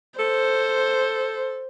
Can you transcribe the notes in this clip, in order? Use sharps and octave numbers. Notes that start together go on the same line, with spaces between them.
A4 C5